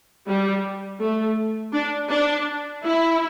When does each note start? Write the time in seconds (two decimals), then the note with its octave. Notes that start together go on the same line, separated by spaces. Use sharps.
0.27 G3
1.00 A3
1.73 D4
2.10 D4
2.84 E4